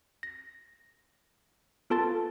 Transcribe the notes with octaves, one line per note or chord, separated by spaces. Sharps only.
A#6
B3 F4 A4 A5 C6 A6